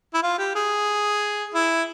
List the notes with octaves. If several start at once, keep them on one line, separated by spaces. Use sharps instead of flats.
E4
F4
G4
G#4
E4